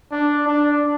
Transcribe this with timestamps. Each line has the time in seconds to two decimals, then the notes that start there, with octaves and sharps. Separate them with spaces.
0.11 D4
0.47 D4